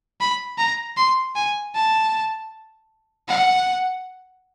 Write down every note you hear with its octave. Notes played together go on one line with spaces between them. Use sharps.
B5
A#5
C6
G#5
A5
F#5